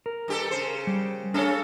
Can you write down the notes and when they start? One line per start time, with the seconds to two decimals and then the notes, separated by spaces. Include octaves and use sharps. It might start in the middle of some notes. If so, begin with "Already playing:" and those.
0.06 A#4
0.28 G2 G4 A4
0.51 C#3 C5
0.87 G3
1.34 A3 C#4 D4 G#4 A4 C#5